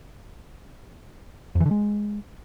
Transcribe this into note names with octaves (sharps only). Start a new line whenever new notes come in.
F2
E3
D3
G#3